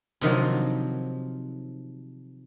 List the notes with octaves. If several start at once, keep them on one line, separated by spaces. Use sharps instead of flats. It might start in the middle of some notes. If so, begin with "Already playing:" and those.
C3 D#3 F3 F#3